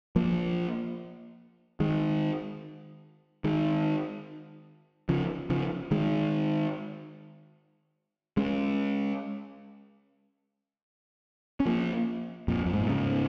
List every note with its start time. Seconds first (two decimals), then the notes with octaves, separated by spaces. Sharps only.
0.16 F3 A#3
1.80 D#3 G#3
3.44 D#3 G#3
5.09 C#3 F3
5.50 C#3 F3
5.91 D#3 G#3
8.37 G#3 C#4
11.60 C#4
11.66 F3 A#3
12.48 F2 A#2
12.66 F2
12.73 G#2
12.81 A#2
12.89 G#2 C#3